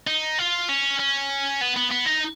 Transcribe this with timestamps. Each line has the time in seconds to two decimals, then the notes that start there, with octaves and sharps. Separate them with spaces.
0.07 D#4
0.38 F4
0.69 C#4
1.00 C#4
1.61 B3
1.77 B3
1.92 B3
2.06 D#4